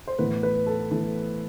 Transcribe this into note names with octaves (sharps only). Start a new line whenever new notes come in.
C5
A2 E3 B3 B4
B4
A4
A2 E3 B3 A4